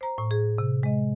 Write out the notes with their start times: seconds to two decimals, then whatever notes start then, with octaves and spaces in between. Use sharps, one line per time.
0.01 C5 A#5
0.18 A2
0.31 G#4
0.58 C3
0.83 G#3 D#5